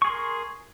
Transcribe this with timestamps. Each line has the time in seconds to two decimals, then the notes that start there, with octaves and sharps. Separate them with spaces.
0.02 C#6
0.04 G#4
0.07 C6
0.10 A#4